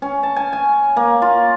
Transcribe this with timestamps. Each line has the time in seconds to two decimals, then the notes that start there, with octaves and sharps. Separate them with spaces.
0.02 C#4
0.23 A5
0.36 G#5
0.53 G#5
0.97 A#3
1.22 F4